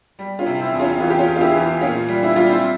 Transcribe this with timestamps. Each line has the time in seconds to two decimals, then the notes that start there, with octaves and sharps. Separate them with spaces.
0.19 G3
0.39 C#4 F4
0.46 C3
0.60 C4 E4
0.74 E2
0.80 C#4 F4
1.00 E3 F4
1.10 G4
1.19 C#4 F4
1.27 E2
1.36 F4
1.41 E4 G4
1.54 E3
1.81 A#2 C#4 F4
2.08 G3
2.23 E4
2.36 G3 F4
2.49 C4 E4